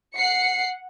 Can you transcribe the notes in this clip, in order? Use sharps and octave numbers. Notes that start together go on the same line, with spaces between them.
F#5 C7 C#7